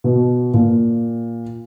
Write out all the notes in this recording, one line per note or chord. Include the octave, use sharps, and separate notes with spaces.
B2
A#2